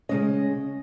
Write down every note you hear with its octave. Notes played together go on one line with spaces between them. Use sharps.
C#3 F3 G#3 C#4 D#5